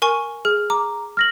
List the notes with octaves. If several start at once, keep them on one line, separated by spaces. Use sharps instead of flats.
A#4 G#5 C#6
G#4 F6
A#5 D6
F6 A#6 F#7